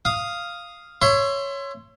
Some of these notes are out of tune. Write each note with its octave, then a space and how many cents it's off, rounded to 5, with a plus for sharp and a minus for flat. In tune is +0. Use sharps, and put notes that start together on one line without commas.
F5 -5 D#6 +0
C#5 +0 E5 +30 C6 +0